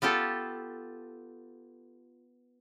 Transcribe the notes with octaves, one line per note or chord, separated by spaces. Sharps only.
B3 F4 G4 A4